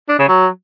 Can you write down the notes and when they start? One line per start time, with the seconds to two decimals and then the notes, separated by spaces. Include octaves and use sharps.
0.09 D4
0.19 C#3
0.29 F#3